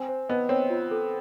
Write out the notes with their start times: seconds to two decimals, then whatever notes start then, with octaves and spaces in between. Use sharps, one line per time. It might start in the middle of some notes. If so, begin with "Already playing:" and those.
Already playing: C4 G#5
0.09 C5
0.29 B3 D#5
0.49 C4 C#5
0.70 F4
0.91 A4